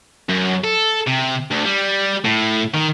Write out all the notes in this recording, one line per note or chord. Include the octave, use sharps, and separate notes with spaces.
F#2
A4
C3
D2
G3
A2
D#3